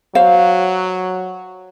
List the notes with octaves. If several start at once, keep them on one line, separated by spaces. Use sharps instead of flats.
F#3 C5 F5